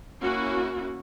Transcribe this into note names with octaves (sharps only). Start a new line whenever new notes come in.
A#3 C#4 E4 F#4